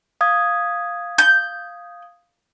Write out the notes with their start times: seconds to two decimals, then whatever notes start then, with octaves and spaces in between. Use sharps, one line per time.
0.21 F5 D#6 G#6
1.18 G6